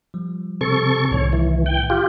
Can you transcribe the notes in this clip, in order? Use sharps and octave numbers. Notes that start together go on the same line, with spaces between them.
F3 G3
C3 A4 C#6
C2 A2 D#3 C#5
E3
G5
F4 G4